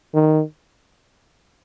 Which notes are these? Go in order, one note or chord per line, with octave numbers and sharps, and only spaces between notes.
D#3